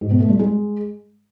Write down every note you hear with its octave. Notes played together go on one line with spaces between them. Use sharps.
G#2
B2
A3
G3
G#3